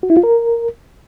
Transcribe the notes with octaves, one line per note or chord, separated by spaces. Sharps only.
F#4
E4
F4
A#4